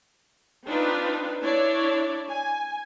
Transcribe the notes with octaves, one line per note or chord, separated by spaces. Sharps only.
C4 D4 D#4 F4 B4
D4 E4 C#5 D5
G#5